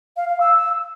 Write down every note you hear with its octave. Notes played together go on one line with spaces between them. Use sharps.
F5
F5
E6